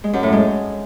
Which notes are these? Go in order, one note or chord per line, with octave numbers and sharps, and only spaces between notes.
G#3
F#2
A2
G#3